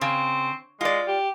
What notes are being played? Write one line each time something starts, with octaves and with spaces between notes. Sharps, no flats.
C#3 C4
G#3 F4 D5
G4